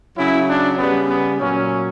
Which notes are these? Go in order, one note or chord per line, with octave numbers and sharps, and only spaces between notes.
C#3 F#3 E4
D4
C#3 G3 B3
B3
A#2 F#3 C#4